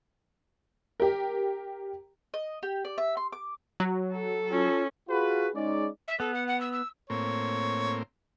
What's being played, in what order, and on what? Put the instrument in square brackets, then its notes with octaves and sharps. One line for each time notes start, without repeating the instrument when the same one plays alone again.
[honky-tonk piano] G4 A#4
[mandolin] D#5
G4
D5
E5
C6
D6
[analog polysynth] F#3
[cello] A4
[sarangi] C#4 [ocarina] F4
[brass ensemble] F4 F#4 G#4 B4
G#3 C#4 D#4 D5
[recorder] E5
[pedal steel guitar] B3 [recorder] A4
[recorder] F#5
F#5
E6
E6
[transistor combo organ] A2 A#3 C4 [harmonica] C#5